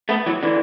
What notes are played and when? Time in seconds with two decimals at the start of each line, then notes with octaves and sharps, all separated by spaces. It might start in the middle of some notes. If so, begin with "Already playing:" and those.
0.09 A3 B3
0.26 E3 F#3
0.43 D3 E3